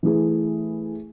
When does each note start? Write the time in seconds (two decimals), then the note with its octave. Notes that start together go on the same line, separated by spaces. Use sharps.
0.03 E3 A3 E4 G#4